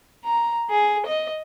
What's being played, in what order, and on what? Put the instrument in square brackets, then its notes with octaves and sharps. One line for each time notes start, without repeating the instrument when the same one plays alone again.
[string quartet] A#5
G#4
D#5